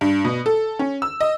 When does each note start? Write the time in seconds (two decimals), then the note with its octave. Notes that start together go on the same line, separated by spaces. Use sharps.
0.01 G2
0.25 B2
0.46 A4
0.79 C#4
1.02 E6
1.21 D#5